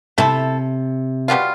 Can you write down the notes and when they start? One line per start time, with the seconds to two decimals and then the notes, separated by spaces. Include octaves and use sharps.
0.18 C3 A3 E4 A4
1.28 B2 G3 B3 F4